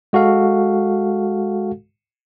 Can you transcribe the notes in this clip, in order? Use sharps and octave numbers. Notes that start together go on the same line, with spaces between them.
G#3 F#4 A4 F5